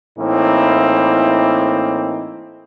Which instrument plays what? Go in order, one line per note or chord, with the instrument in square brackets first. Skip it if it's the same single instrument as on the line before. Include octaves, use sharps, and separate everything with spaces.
[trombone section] A2 E3 A#3 C4 D#4 E4